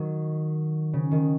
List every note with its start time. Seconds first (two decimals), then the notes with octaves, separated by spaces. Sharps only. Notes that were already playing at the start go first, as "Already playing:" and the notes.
Already playing: D#3 F#3
0.93 C#3
1.11 D#3